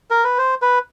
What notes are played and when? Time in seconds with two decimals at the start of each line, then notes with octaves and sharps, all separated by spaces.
0.10 A#4
0.24 B4
0.38 C5
0.62 B4